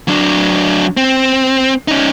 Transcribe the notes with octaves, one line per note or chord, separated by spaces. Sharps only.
F#3 D4
C4
C#4 D#4